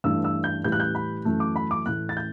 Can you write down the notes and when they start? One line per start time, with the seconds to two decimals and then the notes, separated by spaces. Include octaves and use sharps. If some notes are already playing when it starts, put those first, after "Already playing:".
0.04 G2 E3 A3 E6
0.24 E6
0.44 G6
0.64 A2 E3 G3 G6
0.72 F#6
0.80 G6
0.95 B5
1.25 F#2 E3 A3
1.40 D6
1.56 B5
1.71 D6
1.86 A2 E3 A3 F#6
2.09 A6
2.17 G6